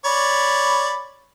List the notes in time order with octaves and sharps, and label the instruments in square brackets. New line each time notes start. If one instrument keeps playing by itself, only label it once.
[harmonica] C#5 D5 B5